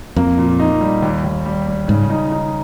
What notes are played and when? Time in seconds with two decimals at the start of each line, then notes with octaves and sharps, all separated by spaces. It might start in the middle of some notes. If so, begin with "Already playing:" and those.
0.16 F2 A#3
0.38 A#2
0.60 D#4
0.81 G3
1.02 D#2
1.24 D#2
1.45 G3
1.67 G3
1.88 G#2 C#3
2.10 D#4
2.32 D#4